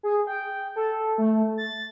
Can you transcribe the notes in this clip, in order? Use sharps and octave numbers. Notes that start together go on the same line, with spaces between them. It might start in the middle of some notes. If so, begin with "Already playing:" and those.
G#4
G5
A4
A3
A6